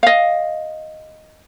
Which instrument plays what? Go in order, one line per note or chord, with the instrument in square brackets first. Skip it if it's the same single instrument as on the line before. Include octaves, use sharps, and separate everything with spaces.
[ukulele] D#5 F5